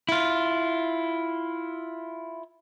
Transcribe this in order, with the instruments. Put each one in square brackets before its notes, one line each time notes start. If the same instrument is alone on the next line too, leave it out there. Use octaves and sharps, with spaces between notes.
[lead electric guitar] E4 F4